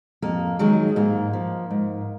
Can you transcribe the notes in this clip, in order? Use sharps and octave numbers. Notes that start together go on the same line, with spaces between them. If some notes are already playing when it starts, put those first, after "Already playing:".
F2 A#3
D#3 F#3 G#3
G#2 A#3
F3
G#2